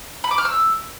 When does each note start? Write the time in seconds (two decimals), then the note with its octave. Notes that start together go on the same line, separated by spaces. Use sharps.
0.24 B5
0.31 D6
0.38 F6
0.45 E6